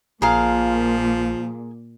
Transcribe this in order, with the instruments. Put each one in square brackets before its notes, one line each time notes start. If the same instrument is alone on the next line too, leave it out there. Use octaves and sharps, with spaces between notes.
[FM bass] A#1 [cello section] A#2 [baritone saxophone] F3 [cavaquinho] G#4 A#4 F5